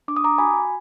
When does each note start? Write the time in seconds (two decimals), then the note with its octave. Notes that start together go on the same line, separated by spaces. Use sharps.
0.08 D4 D6
0.16 D#6
0.24 A#5 D6
0.38 F#4 G#5 B5